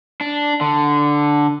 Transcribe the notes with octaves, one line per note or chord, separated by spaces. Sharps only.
D4
D3